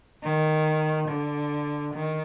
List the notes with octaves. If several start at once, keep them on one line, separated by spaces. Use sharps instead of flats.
D#3
D3
D#3